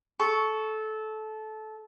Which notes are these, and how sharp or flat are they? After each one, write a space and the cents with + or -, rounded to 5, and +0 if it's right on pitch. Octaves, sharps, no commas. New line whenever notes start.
A4 -20 C#6 +0